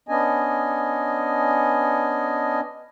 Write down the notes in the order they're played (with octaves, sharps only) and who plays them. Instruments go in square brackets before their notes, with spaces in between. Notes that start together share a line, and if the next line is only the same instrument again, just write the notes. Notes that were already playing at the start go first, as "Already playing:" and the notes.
[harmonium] B3 C#4 D4 D#5 G#5